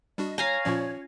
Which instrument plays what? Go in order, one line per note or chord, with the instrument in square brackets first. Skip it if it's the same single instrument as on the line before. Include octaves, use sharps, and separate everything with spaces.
[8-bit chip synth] G3 D4 F#4 [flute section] D#5
[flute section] C#5 [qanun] F5 G#5 A#5
[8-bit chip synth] A#2 F3 D5 [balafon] C#4 F4